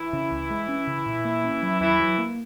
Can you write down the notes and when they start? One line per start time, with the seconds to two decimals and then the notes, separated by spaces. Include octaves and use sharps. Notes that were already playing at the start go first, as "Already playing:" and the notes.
Already playing: E3 E4
0.13 C#3
0.31 C#2
0.50 G#3
0.69 C#4
0.87 C#3
1.06 A#2
1.25 A#3
1.44 C#4
1.63 F#3
1.81 D#2 E3 E4
2.00 F#3
2.18 A#3